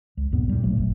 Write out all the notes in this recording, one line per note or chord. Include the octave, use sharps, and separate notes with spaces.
C#2
B1 E2 G#2 B3
A#2 G3
A#1 A#2 F#3 A3
F1